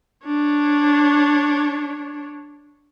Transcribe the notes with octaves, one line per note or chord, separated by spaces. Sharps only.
D4 C#5